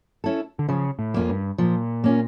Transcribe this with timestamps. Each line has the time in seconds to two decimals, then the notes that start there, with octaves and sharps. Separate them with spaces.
0.24 C#4 E4 A4
0.59 D3
0.69 C#3 F3
0.99 A2
1.14 F2 A#3 C#4 F4
1.29 G2
1.58 A#2 F3
2.04 A#3 C#4 F4